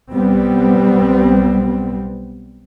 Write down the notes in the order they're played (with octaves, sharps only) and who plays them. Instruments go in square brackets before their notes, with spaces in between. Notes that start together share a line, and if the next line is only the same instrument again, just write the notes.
[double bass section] B1 G3 B3 C4